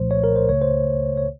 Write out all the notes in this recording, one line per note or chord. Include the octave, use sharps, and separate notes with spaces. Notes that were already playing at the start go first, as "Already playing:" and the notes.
Already playing: C2 A#2 F3 A3 C5
C#5
A#4
C5
C#2 C#3 A3 C#5
C5
C#5